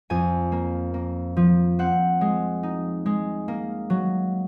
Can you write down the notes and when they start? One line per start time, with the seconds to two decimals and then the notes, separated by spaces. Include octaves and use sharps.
0.10 F2 G#5
0.52 A#3
0.94 A#3
1.37 F3
1.79 C4 F#5
2.21 G#3
2.63 D#4
3.06 G#3
3.48 A#3
3.90 F#3